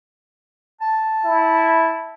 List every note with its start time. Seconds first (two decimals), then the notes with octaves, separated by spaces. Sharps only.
0.81 A5
1.24 E4